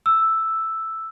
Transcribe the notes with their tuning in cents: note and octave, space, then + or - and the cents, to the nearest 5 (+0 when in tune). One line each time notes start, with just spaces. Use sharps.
E6 +0